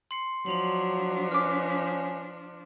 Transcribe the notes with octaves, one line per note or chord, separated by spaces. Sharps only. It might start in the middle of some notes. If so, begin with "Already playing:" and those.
C6 C7 C#7
F3 F#3 D4 C6 F7 F#7
C#4 B4 D6 F6